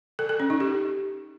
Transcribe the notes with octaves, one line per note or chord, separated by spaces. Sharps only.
A4
A4
C#4
D#4
G4